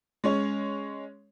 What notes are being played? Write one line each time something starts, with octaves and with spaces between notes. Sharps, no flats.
G#3 C#4 C#5